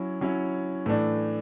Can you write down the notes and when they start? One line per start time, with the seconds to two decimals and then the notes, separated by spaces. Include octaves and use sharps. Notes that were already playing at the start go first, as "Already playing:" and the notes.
Already playing: F#3 C#4 E4
0.21 F#3 C#4 E4
0.86 A2 E3 A3 D4